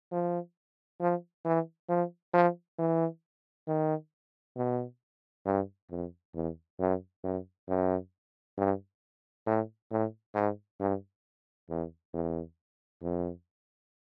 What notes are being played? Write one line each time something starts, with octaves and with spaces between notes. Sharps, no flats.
F3
F3
E3
F3
F3
E3
D#3
B2
G2
F2
E2
F#2
F#2
F#2
G2
A2
A2
G#2
G2
E2
E2
F2